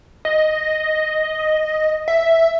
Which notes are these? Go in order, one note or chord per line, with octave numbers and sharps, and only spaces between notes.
D#5
E5